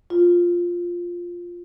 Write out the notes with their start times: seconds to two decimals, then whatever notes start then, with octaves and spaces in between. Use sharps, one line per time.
0.10 F4